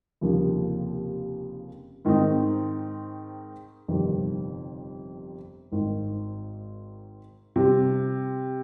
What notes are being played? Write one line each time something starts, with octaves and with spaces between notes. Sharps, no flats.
F1 D#2 C#3 F3 A#3
G#2 D#3 G#3 C4 D#4
G1 F2 C3 D#3
G#1 G#2 D#3
C3 G3 C4